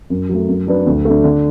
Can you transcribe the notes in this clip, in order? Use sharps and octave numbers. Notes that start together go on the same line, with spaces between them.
F#2
F#3 A3
F#2
F#3 D4 B4
D2
D3 A3
D3